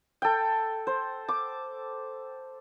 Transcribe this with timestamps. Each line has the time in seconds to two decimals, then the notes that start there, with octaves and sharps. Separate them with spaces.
0.22 A4 G5
0.87 C5
1.29 D6